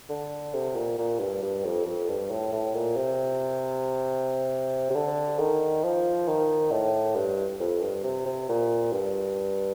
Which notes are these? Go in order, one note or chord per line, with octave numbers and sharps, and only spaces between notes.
D3
C3
A#2
A#2
G2
G2
F2
F2
G2
A2
A2
A#2
C3
C3
D3
D#3
F3
D#3
A2
G2
F2
G2
C3
C3
A#2
G2